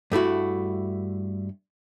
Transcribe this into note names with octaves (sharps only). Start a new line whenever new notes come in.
G2 A3 E4 F#4